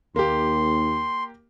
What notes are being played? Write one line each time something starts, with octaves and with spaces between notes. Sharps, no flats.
D#2 A#3 G4 C6